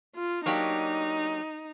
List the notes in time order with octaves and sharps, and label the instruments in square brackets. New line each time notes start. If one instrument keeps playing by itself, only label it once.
[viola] F4
[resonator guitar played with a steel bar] F#3 A#3 D4 G4 [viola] D#4